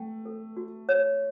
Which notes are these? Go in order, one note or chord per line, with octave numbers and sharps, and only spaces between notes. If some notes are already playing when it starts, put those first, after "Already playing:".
Already playing: A3 G5
A4
F#4
C#5